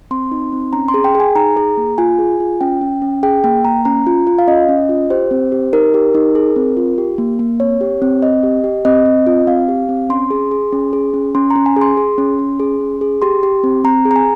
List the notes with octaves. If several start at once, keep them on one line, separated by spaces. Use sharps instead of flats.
C4 C6
D#4
C4
C#4 A#5
C6
G#4
G5
G#4
G#5
D#4 A#5
G#4
A#3
F4 G#5
G#4
F4
C#4 G5
C#4
C#4
G#4 G5
A#3 G5
A#3 A#5
C#4 A#5
F4
F4
F5
C#4 D#5
C#4
F4
G4 C5
C4
G4
D#4 A#4
G4
D#4
G#4
C4
F4
G4
A#3
A#3
C4 C#5
G4
C4
C4 D#5
G4
G4
C4 D#5
C4
F4
C4 F5
G4
C4
C#4 C6
G#4
G#4
C#4
G#4
C#4
C#4 C6
A#5
C#4
G#5
G#4
C6
G#4
C#4
C#4
G#4
C#4
G#4
G4 C6
G4
C4
C4 A#5
G#4
A#5
G#5